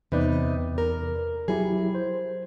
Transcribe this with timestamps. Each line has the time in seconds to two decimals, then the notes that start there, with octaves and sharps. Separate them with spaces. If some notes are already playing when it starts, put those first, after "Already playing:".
0.12 E2 C3 D#4 B4 D5
0.78 A#4
1.48 F#3 E4 G4 G#4
1.95 C5